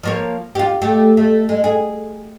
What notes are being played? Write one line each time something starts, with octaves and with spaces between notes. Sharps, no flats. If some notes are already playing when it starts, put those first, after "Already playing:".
F3 A#3 C#5
F4 G4
A3 G4
A3
G#3
G#4